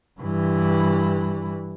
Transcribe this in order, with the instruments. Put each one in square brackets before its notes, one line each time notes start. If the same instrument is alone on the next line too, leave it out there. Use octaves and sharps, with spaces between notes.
[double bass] G2 E3